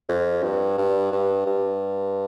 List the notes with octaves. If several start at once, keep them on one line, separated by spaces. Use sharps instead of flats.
F2
G2
G2
G2
G2